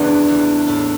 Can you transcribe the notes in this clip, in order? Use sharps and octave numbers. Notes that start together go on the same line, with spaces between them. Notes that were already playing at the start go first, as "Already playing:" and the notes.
Already playing: E2 C#3 E3 B3 D4
E2
A2